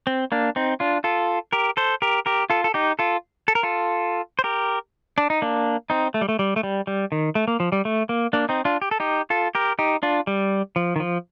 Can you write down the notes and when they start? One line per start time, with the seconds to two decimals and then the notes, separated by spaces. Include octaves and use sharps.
0.07 C4
0.32 A#3 D4
0.56 C4 D#4
0.80 D4 F4
1.04 F4 A4
1.53 G4 A#4
1.77 A4 C5
2.02 G4 A#4
2.26 G4 A#4
2.50 F4 A4
2.64 A4
2.74 D#4 G4
2.99 F4 A4
3.48 A4
3.55 A#4
3.63 F4 A4
4.39 C5
4.44 G4 A#4
5.18 D4
5.30 D#4
5.42 A#3 D4
5.90 C4 D#4
6.14 A3
6.21 G3
6.29 A3
6.39 G3
6.56 A3
6.63 G3
6.87 G3
7.12 D#3
7.35 A3
7.48 A#3
7.60 F3
7.72 G3
7.85 A3
8.09 A#3
8.33 A#3 D4
8.49 C4 D#4
8.65 D4 F4
8.82 G4
8.91 A4
9.00 D#4 G4
9.30 F4 A4
9.55 G4 A#4
9.79 D#4 G4
10.03 D4 F4
10.27 G3
10.76 F3
10.96 D#3
11.00 F3